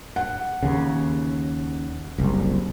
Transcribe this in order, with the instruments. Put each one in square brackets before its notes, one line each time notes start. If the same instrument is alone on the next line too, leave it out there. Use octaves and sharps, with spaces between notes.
[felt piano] F#5
[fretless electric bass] D#2 C#3
F#1 C2